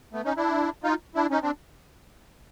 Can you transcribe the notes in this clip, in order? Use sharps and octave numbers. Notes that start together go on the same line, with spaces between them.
A3 B3
C#4 D#4
D4 E4
D#4 F4
D4 E4
C#4 D#4
C4 D4